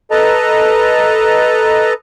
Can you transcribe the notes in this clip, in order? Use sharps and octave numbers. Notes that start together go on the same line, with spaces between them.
A4 B4 D#5 A5 A#5